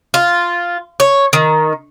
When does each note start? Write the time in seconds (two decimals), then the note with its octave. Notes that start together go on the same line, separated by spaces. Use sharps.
0.14 F4
1.00 C#5
1.33 D#3